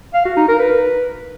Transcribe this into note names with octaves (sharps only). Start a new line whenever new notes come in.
F5
F#4
D#4
A#4
B4